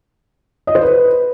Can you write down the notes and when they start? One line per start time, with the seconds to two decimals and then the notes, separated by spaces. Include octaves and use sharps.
0.67 D#5
0.75 C5
0.83 B4